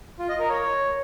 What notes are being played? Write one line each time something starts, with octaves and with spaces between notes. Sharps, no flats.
F4
D#5
A#4
C#5